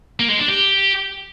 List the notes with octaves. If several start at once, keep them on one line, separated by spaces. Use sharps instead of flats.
A#3
G#3
D4
G4